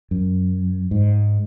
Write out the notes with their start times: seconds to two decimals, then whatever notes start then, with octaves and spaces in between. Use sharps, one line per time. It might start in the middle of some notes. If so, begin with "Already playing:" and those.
0.11 F#2
0.91 G#2